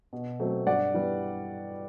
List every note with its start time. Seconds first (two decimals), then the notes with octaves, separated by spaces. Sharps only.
0.13 B2
0.40 F#3 A3 C4
0.67 G2 D5 F#5
0.94 E3 G3 B3